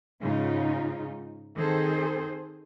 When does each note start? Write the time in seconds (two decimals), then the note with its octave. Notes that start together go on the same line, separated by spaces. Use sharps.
0.20 G#2 C#3 D#4 F4
1.56 D#3 C4 G#4 A4 C5